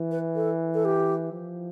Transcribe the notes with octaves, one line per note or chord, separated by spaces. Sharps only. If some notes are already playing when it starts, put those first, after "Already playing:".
Already playing: E3
B4
A4
A4
G4
F3